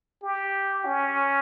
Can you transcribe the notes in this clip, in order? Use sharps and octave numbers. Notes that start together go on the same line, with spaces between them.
G4
C#4